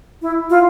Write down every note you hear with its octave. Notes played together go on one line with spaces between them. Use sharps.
E4
F4